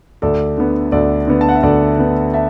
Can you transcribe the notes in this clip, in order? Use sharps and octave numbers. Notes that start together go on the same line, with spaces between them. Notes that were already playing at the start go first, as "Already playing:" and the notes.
D2 A4 D5
D3 B3
D2 A4 D5
D3 B3
A5
F#5
E5
D2 A4 D5
D3 B3
E5 A5